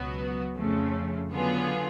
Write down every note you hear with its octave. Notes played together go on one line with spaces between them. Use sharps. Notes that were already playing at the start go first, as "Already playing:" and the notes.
Already playing: C#2 B2 F#3 B3 F#4
F2 C#3 F3 A3
D3 F#3 B3 F4 G#4